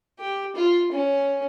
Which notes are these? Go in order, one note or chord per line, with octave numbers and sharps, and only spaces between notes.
G4
F4
C#4